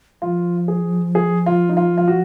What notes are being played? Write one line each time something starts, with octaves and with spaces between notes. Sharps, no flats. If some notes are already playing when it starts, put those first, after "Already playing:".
F3 F4
G#4
G#4
F4
D#4
F4
F4
F#4